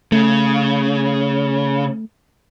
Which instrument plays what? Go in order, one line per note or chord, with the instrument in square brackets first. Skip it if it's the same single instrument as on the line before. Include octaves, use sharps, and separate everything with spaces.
[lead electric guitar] C#3 [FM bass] A3